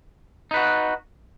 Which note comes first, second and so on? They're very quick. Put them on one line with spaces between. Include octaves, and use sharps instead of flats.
D#4 B4 F#4